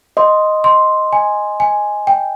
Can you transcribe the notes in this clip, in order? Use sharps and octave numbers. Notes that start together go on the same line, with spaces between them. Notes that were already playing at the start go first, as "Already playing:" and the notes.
D#5 C6
C6
G#5
G#5
G5